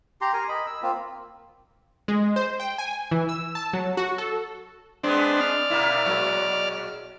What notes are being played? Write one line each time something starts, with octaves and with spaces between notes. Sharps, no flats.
G4 A#5 C6
A#4 G#5
D#5 B5
E6
A#3 C4 F4
G#3
C5
G5
G#5
E3
E6
A5
F#3
F#4
A4
G#3 B3 C4 D4
D5 F6
B2 A#3 E4
A#2 F#3 G#3